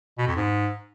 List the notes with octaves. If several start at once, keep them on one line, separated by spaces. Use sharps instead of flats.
B2
F2
G#2